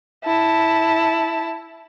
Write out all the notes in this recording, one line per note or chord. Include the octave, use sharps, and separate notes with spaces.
E4 A5